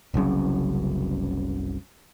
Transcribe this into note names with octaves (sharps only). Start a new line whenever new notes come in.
F#1 C2 F#2 C#3